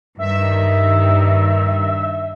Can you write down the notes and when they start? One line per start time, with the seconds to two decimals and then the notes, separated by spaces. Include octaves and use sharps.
0.19 G2 D#3 E5